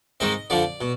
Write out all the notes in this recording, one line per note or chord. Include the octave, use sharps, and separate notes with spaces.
G#2 D#3 G#3 C4 D#5
F2 D3 F3 D5
B2